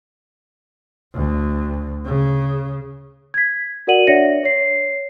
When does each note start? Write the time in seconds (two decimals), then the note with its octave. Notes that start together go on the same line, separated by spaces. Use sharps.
1.14 D2
2.05 C#3
3.34 G#6 B6
3.87 F#4 A#4 D5 F#5 D#7 F#7
4.07 D4 C#5 D5 E5 A#6 C#7
4.43 C#5 C7